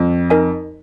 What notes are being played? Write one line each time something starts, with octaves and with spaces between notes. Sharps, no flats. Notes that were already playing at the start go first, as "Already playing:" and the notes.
Already playing: F2
D#4 A#4 D#5 G#5